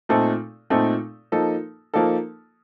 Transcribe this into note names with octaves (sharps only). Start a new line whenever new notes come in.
A#2 A3 C4 D#4 A4
A#2 A3 C4 D#4 A4
F3 A#3 D#4 A4
F3 A#3 D#4 A4